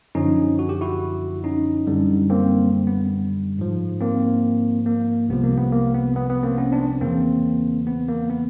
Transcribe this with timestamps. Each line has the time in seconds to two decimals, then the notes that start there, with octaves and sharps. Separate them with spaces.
0.15 F#2 D3 F3 C#4 D#4
0.59 F#4
0.69 G4
0.81 E4 F#4
1.44 C#4 D#4
1.87 F#2 D3 G3
2.30 A#3 C4
2.87 B3
3.59 G#2 F3
4.00 A#3 C4
4.86 A#3
5.29 C2 C3 F3 B3
5.43 A#3
5.58 B3
5.72 A#3
5.94 B3
6.16 B3
6.30 B3
6.43 A#3 C4
6.58 B3 C#4
6.72 C4 D4
7.01 E2 C#3 E3 A#3 C4
7.87 B3
8.08 A#3
8.30 B3